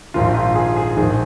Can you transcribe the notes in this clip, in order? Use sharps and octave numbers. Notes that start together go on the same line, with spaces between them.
A#1 G#2 D#3 F4
F4
G#4
G#4
A#1 G#2 D#3 G#4